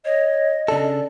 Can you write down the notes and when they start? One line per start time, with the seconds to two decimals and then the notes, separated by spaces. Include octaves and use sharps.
0.05 C#5 D#5
0.68 C#3 D4 A4 D5